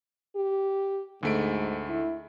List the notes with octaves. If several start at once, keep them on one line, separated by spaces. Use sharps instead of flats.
G4
D2 G#2 A3 D7
E4